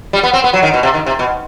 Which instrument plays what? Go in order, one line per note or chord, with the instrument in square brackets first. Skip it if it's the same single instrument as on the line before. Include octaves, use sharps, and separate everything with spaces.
[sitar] G3
B3
C4
B3
F#3
D#3
B2
C3
D#3
C3
B2